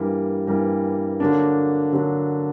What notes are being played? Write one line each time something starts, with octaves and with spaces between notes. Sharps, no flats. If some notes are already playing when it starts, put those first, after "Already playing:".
Already playing: G2 E3 G3 A#3
G2 E3 G3 A#3
D3 F#3 A#3 D4
D3 F#3 A#3 D4